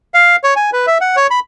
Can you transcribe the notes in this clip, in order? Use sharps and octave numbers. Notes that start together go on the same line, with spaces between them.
F5
C#5
G#5
B4
E5
F#5
C#5
B5